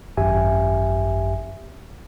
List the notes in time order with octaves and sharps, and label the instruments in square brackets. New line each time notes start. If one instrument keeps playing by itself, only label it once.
[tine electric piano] G#1 F#2 G4 E5 G#5